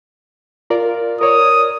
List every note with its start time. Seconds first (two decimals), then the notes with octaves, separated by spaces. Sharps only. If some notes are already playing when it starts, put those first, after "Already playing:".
0.70 F4 A#4 D5
1.21 A#4 C#5 D5 D#6